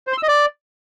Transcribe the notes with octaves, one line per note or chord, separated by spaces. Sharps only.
C5
C6
E6
D#5
D5